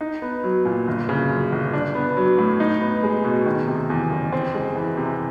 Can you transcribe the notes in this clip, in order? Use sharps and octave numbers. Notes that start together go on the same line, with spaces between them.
D#4
B3
F#3
A#2
G1
C#3
F#2
G1
D4
B3
F#3
A2
D#4
B3
G#3
B2
D#3
C3
E2
F#1
C4
G#3
E3
C3